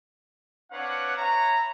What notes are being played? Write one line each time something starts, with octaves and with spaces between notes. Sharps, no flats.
C4 D4 B4 C#5 F5 F#5
B4 C#5 E5 A#5